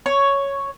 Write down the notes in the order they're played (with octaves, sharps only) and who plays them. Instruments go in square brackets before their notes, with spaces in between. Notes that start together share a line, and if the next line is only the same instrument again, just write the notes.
[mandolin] C#5